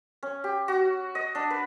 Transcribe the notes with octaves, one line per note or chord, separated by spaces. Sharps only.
C#4
G4
F#4
D#5
D4
B4